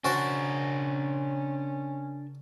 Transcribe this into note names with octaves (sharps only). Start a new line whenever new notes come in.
C#3 C#4 D4 F#4 A#4 C5 A5